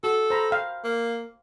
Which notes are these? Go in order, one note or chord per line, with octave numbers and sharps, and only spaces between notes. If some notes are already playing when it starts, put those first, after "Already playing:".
F#4 A4
C5 A#5 B5
F5 G5
A#3